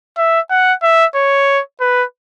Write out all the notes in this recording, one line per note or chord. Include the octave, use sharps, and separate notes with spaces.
E5
F#5
E5
C#5
B4